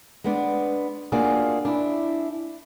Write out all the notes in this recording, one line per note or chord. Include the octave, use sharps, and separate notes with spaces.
G#3 B3 D4
A#3 D4 F4 F#4 G#4
D4 E4